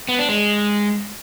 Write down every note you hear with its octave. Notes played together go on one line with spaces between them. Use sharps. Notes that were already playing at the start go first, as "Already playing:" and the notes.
B3
D4
G#3